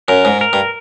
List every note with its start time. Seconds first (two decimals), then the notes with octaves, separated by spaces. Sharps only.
0.08 F#2 A#4
0.25 G#2
0.41 A#4
0.53 G2